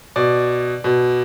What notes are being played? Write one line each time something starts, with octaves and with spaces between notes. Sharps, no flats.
B2 D5
B2